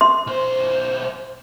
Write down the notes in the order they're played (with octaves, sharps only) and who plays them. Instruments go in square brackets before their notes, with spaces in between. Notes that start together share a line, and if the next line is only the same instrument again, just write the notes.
[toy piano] C6
[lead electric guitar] B1 C5